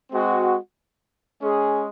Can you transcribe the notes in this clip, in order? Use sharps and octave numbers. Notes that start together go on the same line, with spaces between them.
G#3 C4 F#4
G#3 C#4 G#4